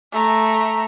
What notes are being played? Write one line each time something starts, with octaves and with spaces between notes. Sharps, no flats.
A3 A#5